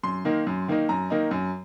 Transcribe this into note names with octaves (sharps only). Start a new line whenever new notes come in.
F#2 C6
D#3 A#3 D#4
F#2
D#3 A#3 D#4
F#2 A#5
D#3 A#3 D#4
F#2